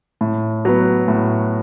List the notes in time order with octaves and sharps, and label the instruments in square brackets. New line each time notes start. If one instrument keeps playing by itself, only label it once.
[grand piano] A2
F#3 B3
A2